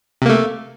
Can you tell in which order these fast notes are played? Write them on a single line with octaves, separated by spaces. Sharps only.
C3 A#3 A3